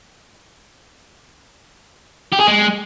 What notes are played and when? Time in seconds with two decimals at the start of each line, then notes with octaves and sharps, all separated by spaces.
2.33 G4
2.40 G#4
2.47 G#3